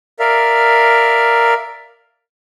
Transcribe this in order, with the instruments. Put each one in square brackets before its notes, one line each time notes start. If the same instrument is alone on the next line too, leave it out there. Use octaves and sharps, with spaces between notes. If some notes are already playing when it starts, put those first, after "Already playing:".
[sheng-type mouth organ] A#4 D5 E5 F5